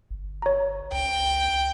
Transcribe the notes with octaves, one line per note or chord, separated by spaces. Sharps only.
G1
C#5 A#5
C#2 G5